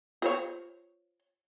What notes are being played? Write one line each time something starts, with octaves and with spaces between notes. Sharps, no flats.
F4 C5 C#5